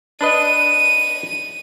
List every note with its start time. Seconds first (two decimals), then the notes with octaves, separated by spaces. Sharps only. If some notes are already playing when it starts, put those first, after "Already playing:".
0.21 D4 B4 D#5 D#7